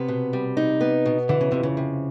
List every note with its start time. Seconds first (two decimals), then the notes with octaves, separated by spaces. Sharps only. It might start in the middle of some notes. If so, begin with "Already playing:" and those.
Already playing: C3 B3
0.08 B2
0.33 G3
0.57 D#4
0.81 B3
1.06 B2
1.29 D3 E3
1.41 C#3
1.52 F2 C3
1.63 C#3
1.77 C3